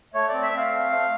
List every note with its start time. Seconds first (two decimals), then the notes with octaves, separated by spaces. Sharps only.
0.14 A3 C#5
0.28 C4 D5
0.43 E5
0.52 C4 F5
0.72 A3
0.90 A3